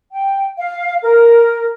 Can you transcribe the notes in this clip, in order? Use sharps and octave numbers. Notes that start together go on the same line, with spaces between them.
G5
F5
A#4